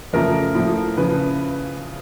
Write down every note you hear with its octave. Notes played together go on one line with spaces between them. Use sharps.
F2 C#3 F3 A3 A#4
A2 F3 A3
C#3 F3 B4